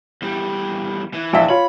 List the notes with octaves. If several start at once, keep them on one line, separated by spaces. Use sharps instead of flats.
E2 G3
E3
A#1 E5 F5
F4 C#5 B5